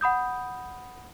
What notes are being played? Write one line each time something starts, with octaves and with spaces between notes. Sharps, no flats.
F#5 B5 D#6 G6